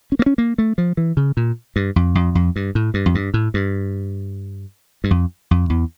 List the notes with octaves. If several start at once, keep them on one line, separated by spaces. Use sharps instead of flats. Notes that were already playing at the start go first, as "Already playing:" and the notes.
C#4
A#3
C#4
A#3
A3
F3
E3
C#3
A#2
G2
F2
F2
F2
G2
A2
G2
F2
G2
A2
G2
G2
F2
F2
E2